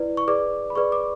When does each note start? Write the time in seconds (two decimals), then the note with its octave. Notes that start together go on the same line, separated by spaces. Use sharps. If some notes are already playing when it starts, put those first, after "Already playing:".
Already playing: E4 B4 D5
0.17 C#6
0.28 G#4 B4 D5 D6
0.70 B5
0.75 G#4 B4 D5 C#6
0.92 D6